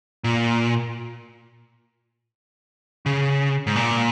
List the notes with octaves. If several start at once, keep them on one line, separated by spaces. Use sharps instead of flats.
A#2
C#3
G#2
A#2